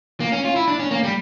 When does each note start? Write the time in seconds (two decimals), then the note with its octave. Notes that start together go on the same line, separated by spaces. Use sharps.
0.20 A#3
0.32 C#4
0.45 F4
0.56 E4
0.68 D4
0.79 C#4
0.91 A#3
1.04 G3